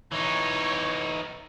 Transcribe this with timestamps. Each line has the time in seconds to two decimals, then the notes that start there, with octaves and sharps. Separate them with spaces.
0.12 E3 D#4 C#5